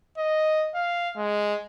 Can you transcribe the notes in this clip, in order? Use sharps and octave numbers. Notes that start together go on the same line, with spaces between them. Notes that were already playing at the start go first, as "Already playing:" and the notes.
D#5
F5
G#3